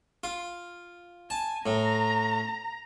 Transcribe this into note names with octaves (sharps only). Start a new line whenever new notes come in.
F4
G#5 A5
A2 A#5